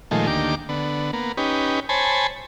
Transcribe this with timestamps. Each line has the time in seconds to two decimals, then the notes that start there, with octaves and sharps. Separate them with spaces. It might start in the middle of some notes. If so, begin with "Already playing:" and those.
0.11 A#2 D#3 F3 G#3 A3
0.27 D2 D#3 A#3 G4 D6
0.69 D3 B3
1.13 A#3 B3
1.37 C#4 D#4 G4 B4
1.89 C5 C#5 G#5 A5 B5